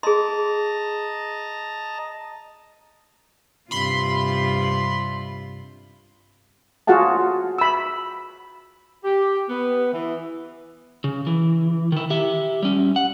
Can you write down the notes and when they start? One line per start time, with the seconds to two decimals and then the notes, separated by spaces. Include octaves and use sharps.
0.03 G#4 D#5 A5 A#5 C6
3.71 G2 C3 F4 B5 C6
6.87 F4 F#4 G#4 F5 F#5 A5
7.58 B5 E6
9.04 G4
9.49 B3
9.93 E3
11.04 C#3
11.27 E3
11.92 D#3 E4
12.10 G4 E5
12.63 G3 C#4
12.96 F#5